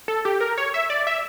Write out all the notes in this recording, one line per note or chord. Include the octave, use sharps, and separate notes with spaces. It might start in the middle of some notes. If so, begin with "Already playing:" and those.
A4
G4
A#4
C#5
E5
D5
E5